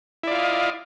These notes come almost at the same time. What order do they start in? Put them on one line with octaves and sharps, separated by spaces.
E4 D5 F4 F5 D#5